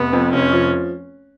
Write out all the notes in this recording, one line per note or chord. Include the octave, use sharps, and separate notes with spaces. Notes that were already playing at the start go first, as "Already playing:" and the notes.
Already playing: F1 B3
F2
F1 C#4
F3